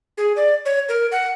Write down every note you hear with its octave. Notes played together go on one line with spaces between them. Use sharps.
G#4
D5
C#5
A#4
F#5